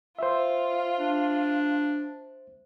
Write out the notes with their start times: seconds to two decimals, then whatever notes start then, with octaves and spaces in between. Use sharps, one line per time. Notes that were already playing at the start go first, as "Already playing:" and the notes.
0.19 F4 C5 E5
0.99 D4